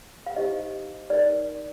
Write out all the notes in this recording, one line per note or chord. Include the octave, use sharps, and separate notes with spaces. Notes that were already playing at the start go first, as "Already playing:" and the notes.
F5
D#4 G4 C5 D#5
D#4 A#4 D5